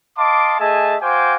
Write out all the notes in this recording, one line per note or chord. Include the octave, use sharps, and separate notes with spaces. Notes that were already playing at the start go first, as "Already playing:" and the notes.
D#5 F5 A5 C6 D6
A3 G#4 D#5 E5 G#5 A5
F#4 C5 F5 G5 G#5 D6